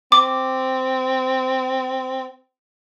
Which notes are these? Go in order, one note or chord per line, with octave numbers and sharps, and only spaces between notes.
C4 D6